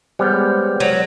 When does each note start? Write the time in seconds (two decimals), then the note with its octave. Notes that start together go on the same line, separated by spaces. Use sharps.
0.19 G3 G#3 B3 G#4 C5 C#5 F6 G6
0.80 F#3